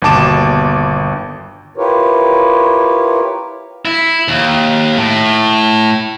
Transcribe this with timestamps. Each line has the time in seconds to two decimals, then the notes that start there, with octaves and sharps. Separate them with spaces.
0.02 G1 D#2 B2 A5 D6 E7
1.77 E4 F4 G4 A#4 B4 C#5
3.85 E4
4.28 D#2
4.96 A2